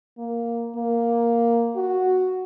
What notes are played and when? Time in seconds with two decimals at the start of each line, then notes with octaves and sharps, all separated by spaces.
0.18 A#3
0.76 A#3
1.76 F#4